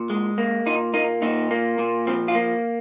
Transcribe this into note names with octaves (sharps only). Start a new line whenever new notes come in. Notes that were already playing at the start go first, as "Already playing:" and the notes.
Already playing: A#2
G#3
A#3
A#2 D#4
A#3 D#4
A#2 D#4
A#3
A#2
F3 C4
F4
A#3